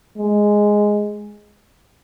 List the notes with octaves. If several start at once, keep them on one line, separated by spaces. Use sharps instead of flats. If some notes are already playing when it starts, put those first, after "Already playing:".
G#3